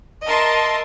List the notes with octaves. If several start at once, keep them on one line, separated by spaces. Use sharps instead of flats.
A#4 D#5 E5 A5 C6